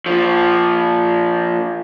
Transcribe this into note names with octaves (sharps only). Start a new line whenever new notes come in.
A#2 F3